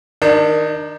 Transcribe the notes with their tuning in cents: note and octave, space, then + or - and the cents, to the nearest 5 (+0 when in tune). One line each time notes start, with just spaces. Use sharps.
D#3 +0 D4 +30